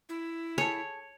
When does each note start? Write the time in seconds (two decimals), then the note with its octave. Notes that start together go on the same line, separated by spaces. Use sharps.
0.09 E4
0.58 G#4 A4 C#5